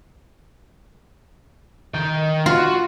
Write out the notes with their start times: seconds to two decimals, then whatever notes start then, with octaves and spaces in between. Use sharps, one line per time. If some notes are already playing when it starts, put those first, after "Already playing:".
1.94 D#3 G5
2.46 F4 F#4